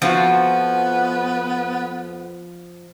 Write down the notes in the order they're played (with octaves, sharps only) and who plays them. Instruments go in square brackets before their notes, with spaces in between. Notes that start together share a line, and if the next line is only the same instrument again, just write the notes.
[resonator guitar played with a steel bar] F2 F4 F#4 [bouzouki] F3 [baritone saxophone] B3